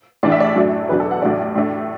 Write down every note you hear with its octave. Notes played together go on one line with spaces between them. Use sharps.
A1 A2 E3 D4 D5
E5
D5
F#2 F#3 A3 D4
E2 B2 F#3 D4 B4
A4
F#5
A1 A2 F#3 D4 D5
A2 A3 D4